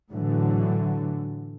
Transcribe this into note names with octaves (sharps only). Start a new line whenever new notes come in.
A2 D3 E3 F#3